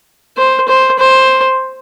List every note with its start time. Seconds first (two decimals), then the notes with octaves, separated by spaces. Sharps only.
0.37 C5
0.68 C5
0.99 C5